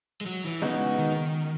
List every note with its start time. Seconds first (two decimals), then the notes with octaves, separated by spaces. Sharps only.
0.21 G#3
0.26 F#3
0.45 E3
0.62 C#3 G#3 B3 D#4 F#4
0.99 D#3